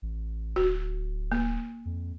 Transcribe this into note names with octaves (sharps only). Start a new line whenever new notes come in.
A1
D1 F#4
A#3
F2